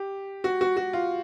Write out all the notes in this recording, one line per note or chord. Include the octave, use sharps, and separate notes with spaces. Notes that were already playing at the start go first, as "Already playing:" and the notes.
Already playing: G4
F#4
F#4
F#4
F4